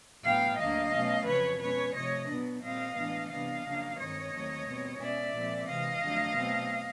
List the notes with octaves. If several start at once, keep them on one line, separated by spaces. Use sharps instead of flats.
A2 F#3 B3 F5 G5
D2 D3 F#3 A#3 D#5 F5
B2 F#3 A3 C#4
F2 C#3 F#3 B4 C#5
B2 G#3 C#4 B4 C#5
C3 F3 A3 C#5 D#5
B2 F#3 B3 D4
A#2 G3 C4 D#5 F5
A2 E3 G#3 B3 D4
C3 E3 G3 B3 D4 D#5 F5
F2 C#3 F#3 A#3 D4
G2 D#3 G#3 C4 C#5 D#5
D#2 D#3 F#3 A3 C4
B2 G3 C4
B2 G#3 C#4 D5 E5
A#2 F3 G#3 C4
C3 E3 G#3 D#5 F5
F2 D3 F#3 A3
B2 F#3 A3 C4